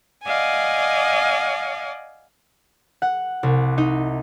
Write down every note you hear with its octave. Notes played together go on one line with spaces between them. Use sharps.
D5 D#5 F5 F#5 G#5
F#5
C2
D#4